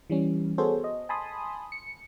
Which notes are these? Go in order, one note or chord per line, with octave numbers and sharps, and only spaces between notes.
E3 G3 C#4
B3 F#4 G#4 A4 C5 C#5
D#5
G#5 A5 B5 C6 D#6
C#7